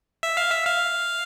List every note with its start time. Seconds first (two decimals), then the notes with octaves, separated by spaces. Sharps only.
0.23 E5
0.37 F5
0.51 E5
0.66 F5